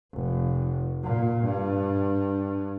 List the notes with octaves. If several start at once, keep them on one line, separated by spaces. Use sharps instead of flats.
F1
A#2
G2